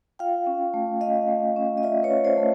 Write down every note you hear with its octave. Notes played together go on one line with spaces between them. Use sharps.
F4 F5 G5
C#4
A3
C#4 D#5 F5
A3
C#4
D#5
F4 D5 E5
B4 C#5
C#4
C5 D5
A3